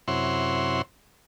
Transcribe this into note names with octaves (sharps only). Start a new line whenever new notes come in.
F#2 C3 E4 C#5 F#5 C6